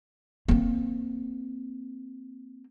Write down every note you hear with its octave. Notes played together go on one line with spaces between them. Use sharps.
A#3 C4